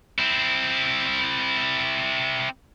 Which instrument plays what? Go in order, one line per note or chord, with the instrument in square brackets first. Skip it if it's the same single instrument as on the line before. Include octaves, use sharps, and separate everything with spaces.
[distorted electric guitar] C4 E4